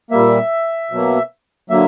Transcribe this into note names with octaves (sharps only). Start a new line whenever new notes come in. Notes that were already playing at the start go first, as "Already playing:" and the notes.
A#2 G3 A#3 E5
B2 F#3 A#3
D3 F#3 A#3 E5